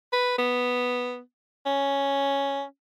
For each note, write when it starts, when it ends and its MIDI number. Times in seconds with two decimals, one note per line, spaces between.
0.13 0.37 71
0.38 1.19 59
1.66 2.63 61